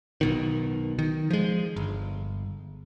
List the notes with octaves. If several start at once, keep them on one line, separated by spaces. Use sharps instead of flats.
B1 B2 D#3
D#3
F3 G#3
G1